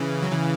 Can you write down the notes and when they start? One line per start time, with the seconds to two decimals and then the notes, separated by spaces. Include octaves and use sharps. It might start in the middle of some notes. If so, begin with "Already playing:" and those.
Already playing: C#3 E3
0.22 F#3
0.32 C#3 E3